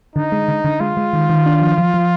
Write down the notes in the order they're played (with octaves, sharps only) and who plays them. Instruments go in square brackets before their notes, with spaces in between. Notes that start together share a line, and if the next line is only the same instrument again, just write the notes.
[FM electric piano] D3 [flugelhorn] D#4
[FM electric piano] G#3
D3
D3
[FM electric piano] G#3 [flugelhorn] F4
[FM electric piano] G#3
D#3
D#3
D4
F3
F3
F3